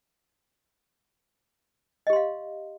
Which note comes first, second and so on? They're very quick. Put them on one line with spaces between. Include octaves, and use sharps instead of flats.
D#5 G4 C6 F5